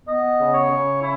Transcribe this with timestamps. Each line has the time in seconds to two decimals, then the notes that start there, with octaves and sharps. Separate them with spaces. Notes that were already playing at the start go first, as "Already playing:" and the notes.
0.06 B3 D#5
0.38 C#3
0.54 C#5
0.69 C#3
1.00 C#4 E4